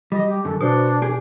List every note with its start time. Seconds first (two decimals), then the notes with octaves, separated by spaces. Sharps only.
0.12 G3 D#5
0.28 G4
0.45 F#2 D3 A4
0.61 B2 D4 F#4 C5
1.02 G4 G#4